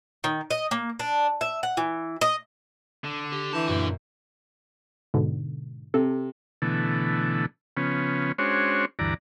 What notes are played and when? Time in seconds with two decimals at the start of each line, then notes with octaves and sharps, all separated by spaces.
0.24 D#3
0.50 D#5
0.71 A#3
0.99 D4
1.41 E5
1.63 F#5
1.77 E3
2.21 D#5
3.04 D3
3.33 G4
3.53 E3 A5 G6 E7
3.68 F#2 A#2 A#3 F#4 B4
5.14 G#2 B2 D3
5.94 C3 A4
6.62 B2 D3 E3 A3
7.77 C#3 F3 B3 C#4
8.38 G#3 C#4 D4 F#4 C5 C#5
8.99 D2 G2 E3 D5 A#5